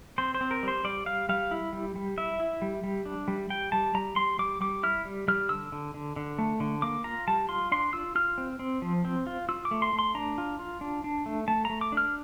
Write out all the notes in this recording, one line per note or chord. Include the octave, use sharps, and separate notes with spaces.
C4 C5
C5
C4
A#4
G3 C5
G3 D5
G3 F5
G3 F5
E4
G3
G3
E4 E5
E4
G3
G3
D4
G3
G3 G5
G3 A5
G3 A#5
G3 C6
G3 D6
G3 D6
E4 F6
G3
G3 F6
D3 E6
D3
D3
D3
A3
D3
A#3 D6
F4 A#5
G3 A5
F4 C6
D4 C6
F4 E6
F4 F6
C4
C4
F3
C4
F4
F4 E6
D6
A3
C6
A3
C6
D4 A#5
F4
F4
D4
D4
A3
A3 A5
A3 A#5
D6
D4 F6